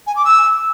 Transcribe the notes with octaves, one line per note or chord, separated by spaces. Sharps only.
G#5
D6
E6